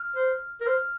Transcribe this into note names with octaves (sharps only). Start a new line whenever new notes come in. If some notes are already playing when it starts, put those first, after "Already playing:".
Already playing: F6
C5
A#4
C5 F6